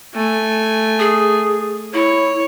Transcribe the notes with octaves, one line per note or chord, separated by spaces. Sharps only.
A3 G#5
G#4
E4 C#5